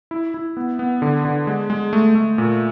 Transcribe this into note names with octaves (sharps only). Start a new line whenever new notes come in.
E4
E4
B3
B3
D3
D3
G#3
G#3
A3
A3
A#2